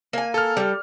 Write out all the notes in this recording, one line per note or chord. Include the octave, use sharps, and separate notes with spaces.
A#3 G#5
A4 F6
G3